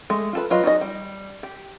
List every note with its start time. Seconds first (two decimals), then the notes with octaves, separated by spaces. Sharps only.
0.10 G#3 A3
0.33 F4 A4 B4
0.50 F#3 F4 B4 D#5
0.63 D#4 F#4 G#4 D#5
0.81 G3
1.43 G4